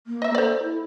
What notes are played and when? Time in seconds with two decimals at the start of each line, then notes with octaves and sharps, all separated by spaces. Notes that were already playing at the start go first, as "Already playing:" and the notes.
0.07 A#3
0.22 D#5 E5
0.35 A4 C5 D5
0.63 E4